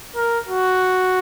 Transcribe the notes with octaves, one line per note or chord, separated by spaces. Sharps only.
A#4
F#4